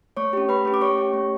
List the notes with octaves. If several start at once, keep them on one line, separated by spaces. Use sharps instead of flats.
A3 C#5 C#6
C#4 G4
A3 B4 B5
C#4 G4
D6
A3 C#5 C#6
C#4 G4
A3